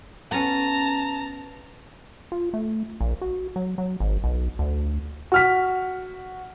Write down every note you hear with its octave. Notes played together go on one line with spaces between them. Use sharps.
B3 C#4 A5 A#5
F4
A3
A#1
F#4
F#3
F#3
G#1
B1
D2
F#4 F6 B6